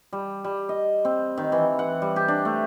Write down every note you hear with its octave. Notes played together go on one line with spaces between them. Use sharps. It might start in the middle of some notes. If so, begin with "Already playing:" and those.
G3
G3
D#5
C4
D#3
E3
F#5
G3
G4
D4
A3